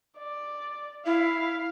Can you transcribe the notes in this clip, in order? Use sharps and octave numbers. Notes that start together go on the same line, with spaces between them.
D5
E4 F5